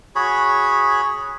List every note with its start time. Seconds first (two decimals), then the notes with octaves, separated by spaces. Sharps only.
0.16 F#4 G#4 C#5 B5